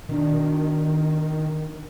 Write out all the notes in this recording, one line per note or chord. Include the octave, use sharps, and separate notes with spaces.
B2 D#3 D4